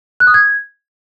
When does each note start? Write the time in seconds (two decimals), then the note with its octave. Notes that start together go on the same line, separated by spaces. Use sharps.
0.20 F#6
0.27 D#6
0.34 G#6